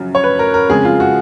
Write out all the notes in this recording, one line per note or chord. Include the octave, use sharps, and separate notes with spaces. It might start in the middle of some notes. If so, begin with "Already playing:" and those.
Already playing: F#2 C#3 F3
C#5
B4
A#4
A#4
F2 C#3 G#3 G#4
F4
F#4